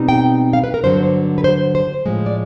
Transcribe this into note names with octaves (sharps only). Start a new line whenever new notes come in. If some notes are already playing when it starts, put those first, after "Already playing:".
Already playing: B2 G3 C4 D#4
G5
F5
B4
A#4
G2 D3 F#3 C5
B4
C5
C5
A2 F3 G#3
D5